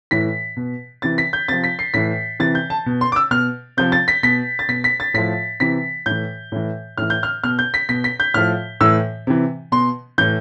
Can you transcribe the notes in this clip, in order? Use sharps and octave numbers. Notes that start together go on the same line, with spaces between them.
A2 E3 B6
B2
C3 E3 A6
B6
G6
C3 F3 A6
B6
C7
A2 E3 B6
C3 E3 A6
G6
A5
B2
C6
D6
E6
B2 F6
C3 F3 G6
A6
B6
B2 B6
A6
B2 B6
B6
A6
A2 F3 B6
C3 E3 B6
A2 E3 G6
A2 E3
A2 E3 F6
G6
F6
B2 F6
G6
B6
B2 B6
B6
G6
A2 F3 F6
A2 E3 E6
C3 E3
B2 C6
A2 E3 G6